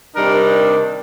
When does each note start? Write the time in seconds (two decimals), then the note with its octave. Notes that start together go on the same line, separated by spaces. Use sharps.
0.16 C3 D#3 G3 D4 A#4